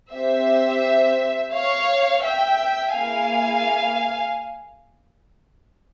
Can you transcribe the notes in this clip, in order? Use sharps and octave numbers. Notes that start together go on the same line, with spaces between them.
C4 G4 C5 E5
C#5 F5
E5 G5
A#3 E4 G#4 F5 G#5